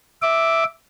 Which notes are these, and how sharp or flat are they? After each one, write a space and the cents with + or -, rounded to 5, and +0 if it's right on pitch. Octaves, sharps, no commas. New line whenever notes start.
E5 +0 D6 +0